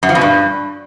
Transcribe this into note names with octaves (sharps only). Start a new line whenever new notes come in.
F#2
F3
B2
G2